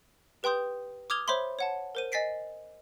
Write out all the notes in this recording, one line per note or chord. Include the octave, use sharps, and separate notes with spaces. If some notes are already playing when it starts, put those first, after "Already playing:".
G4 B4 G5 C6 D#6 G6
D6 D#6 F6 G#6 F7 G7
C5 C#5 E5 B5 C6
C#5 F#5 A5
A#4 C5 D#7
D#5 G#5 A6 B6 C7 D7